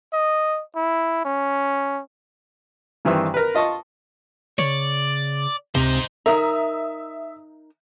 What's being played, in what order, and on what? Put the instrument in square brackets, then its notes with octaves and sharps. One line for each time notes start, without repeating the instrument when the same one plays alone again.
[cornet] D#5
E4
C#4
[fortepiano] G2 D#3 E3 C4 C5 E6
A#4 B4
F4 D#5 A5 C#6
[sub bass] C#3 [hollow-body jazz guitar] C#5 [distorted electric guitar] D5
[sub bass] C#2 [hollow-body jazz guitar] C3 [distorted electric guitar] D#4 C5
[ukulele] D#4 A#4 [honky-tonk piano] E5 D#6